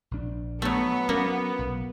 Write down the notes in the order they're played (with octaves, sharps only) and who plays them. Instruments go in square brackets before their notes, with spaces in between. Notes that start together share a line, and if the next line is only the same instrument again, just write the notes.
[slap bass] A#1 D4
[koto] F#3 A3 [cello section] B3
[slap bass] F#3 C#4 [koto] A#3
[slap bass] B1